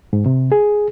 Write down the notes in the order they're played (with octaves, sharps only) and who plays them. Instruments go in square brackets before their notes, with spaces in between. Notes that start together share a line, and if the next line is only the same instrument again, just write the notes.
[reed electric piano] G#2
C3
G#4